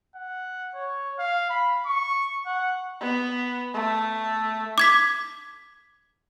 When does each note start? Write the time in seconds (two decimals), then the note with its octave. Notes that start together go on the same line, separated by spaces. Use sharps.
0.16 F#5
0.75 C#5
1.19 F5
1.50 B5
1.86 C#6
2.46 F#5
3.00 B3
3.74 A3
4.78 D6 G#6 B6